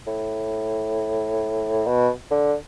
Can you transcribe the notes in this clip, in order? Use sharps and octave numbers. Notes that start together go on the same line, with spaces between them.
A2
B2
D3